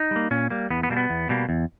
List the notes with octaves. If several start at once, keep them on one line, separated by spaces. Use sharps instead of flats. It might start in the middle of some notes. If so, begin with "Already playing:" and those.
Already playing: D#4
G3 A#3
A#2 C#4
G3 A#3
E2 B3
B3
B2 G3 A#3
B3
E2
B2 G3 A#3
E2